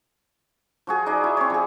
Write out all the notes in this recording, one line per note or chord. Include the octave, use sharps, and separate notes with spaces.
F3 F#4 G#4
D#4 G#4 D5 D#5
E4
C4 C#5
F3 G#4